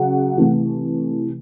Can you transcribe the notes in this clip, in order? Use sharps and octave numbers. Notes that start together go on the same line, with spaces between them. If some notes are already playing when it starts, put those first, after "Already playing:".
Already playing: C#3 F#3 F#5
C3 E3 A3